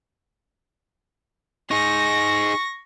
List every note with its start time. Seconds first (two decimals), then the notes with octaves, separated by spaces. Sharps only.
1.71 D#4 G#4 C#6 A#6